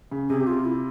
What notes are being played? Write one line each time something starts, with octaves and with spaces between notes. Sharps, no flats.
C#3
C3 G#4
G4
F4
E4